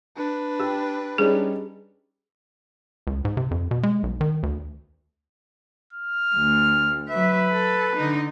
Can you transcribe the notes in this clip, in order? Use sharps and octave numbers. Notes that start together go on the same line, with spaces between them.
D4 B4
G4 E6
G3 C#4 D#4 G#4
C#2
G#2
C3
F2
B2
G#3
B1
D#3
D2
F6
D2
F#3 B4 E5
A4
D3 D#4